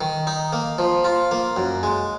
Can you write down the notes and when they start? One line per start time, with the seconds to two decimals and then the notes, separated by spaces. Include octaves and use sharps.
0.01 D#3
0.27 D#4
0.53 A#3
0.79 F3
1.04 F4
1.31 A#3
1.56 F#2
1.83 G#3